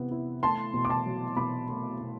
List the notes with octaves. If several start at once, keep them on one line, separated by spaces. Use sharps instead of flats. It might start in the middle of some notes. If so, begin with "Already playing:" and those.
Already playing: C3 B3 E4
E4
A3 A5 C6
B2
D6
A5 C6
F#3
B2 B5 D6
A3
B2